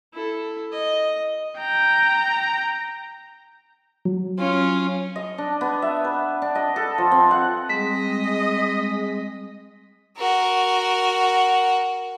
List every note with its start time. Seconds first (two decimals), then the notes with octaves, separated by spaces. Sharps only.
0.13 E4 A4
0.72 D#5
1.60 G5 A#5
4.05 F#3
4.38 C#4 F4
5.16 D#5
5.38 D4
5.61 B3
5.82 E5
6.04 B4
6.42 D4
6.55 D#5
6.76 A4
6.98 F3
7.12 C4
7.31 F#5
7.69 G3 G#3 C4 D#5 B6
10.17 F#4 A#4